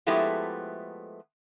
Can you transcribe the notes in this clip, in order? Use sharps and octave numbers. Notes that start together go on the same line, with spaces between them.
F3 G#3 A3 B3 E4 G4